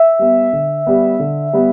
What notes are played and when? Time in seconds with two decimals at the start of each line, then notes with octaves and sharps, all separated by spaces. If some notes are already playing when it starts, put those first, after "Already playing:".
Already playing: E5
0.19 G3 B3
0.53 D3
0.87 G3 B3
1.20 D3
1.53 G3 B3